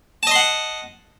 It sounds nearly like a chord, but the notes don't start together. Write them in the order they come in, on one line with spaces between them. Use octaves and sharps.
A5 D#5 C6 F#5